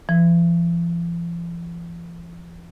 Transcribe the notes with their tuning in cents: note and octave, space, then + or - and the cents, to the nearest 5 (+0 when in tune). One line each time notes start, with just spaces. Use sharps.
F3 -45